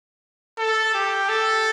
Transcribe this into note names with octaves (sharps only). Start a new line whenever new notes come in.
A4
G4
A4